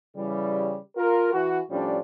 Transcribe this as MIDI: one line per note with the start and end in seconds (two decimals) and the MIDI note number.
0.17 0.76 49
0.17 0.76 52
0.17 0.76 55
0.97 1.30 65
0.97 1.30 70
1.33 1.59 52
1.33 1.59 66
1.71 1.99 45
1.71 1.99 53
1.71 1.99 55
1.71 1.99 61
1.71 1.99 62